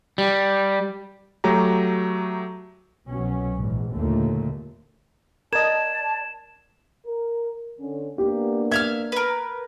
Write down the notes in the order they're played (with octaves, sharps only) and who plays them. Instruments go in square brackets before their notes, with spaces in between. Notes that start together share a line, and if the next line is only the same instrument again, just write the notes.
[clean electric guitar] G3
[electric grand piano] F#3 A3 G4 A#5
[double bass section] C2 B2 F#3 C#4
A#1 E2 G#2
F#1 D#2 A#2 D3 A3 A#3
[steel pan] A#4 D#5 [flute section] D5 A5 [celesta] G#6 A6 [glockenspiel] E7
[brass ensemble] A#4
D3 C#4
[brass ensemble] A#3 B3 D4 [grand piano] G4
[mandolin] E5 F5 F6 [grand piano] G#6
[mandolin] A#4 B4